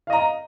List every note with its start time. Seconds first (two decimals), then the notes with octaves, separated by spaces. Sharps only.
0.07 F5
0.10 D#5
0.13 A#5